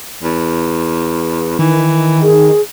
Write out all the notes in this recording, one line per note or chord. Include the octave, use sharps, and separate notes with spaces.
E2
D#3 E3
G#4